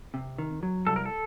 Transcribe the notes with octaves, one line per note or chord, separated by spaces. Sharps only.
C3
D#3
F#3
C2 A4
A#4
A4